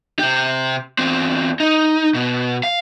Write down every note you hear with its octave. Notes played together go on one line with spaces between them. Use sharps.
C3 G4
E2 C4
D#4
B2
F5